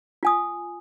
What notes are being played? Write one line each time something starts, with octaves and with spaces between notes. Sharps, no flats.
F4 G#5 D#6